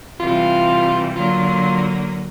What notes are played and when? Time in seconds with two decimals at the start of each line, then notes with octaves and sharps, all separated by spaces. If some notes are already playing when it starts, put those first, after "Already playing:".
0.20 C3 E3 G3 F4
1.16 D3 F#3 A#3 F4